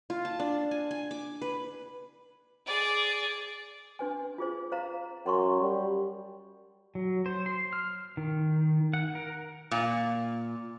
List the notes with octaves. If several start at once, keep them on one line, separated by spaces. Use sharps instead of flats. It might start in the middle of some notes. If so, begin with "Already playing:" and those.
F4
A5
D4
G#5
G#5
D6
B4
G#4 D5
D4 B4 G#5
F4 G#4 C5
C5 F5 A#5
F#2 F#5 C6 C#6
G3
F#3
C5
C6
F6
D#3
F#5
A#4
A#2